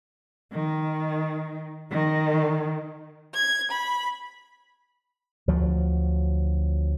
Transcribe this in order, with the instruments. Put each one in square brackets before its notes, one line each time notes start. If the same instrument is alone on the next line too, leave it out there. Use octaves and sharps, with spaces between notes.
[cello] D#3
D#3
[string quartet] G#6
B5
[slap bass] D2 F3 F#3